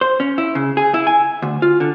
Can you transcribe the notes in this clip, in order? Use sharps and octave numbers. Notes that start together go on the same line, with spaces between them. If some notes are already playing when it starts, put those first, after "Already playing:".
C5
C#4
E4
C#3
G#4
E4
G#5
D2
F4
D3